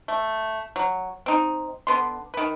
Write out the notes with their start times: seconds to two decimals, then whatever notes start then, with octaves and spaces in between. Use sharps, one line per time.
0.08 A3
0.76 F#3
1.26 C4 D#4
1.87 D3 B3 C6
2.34 D#3 B4